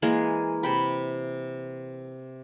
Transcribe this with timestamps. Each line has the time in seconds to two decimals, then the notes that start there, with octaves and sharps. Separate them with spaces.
0.02 E3 G#3 A#3 G#4
0.63 C3 G5 B5